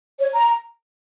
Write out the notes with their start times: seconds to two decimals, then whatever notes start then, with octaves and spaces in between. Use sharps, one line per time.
0.19 C#5
0.34 A#5